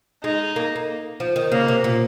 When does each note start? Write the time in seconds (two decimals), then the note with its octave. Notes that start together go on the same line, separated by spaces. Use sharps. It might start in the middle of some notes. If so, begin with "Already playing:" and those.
0.24 G#3 D#4
0.56 A#3
0.76 A#3
1.20 F3
1.36 D#3
1.52 C#3 A#3
1.68 C3
1.84 A#2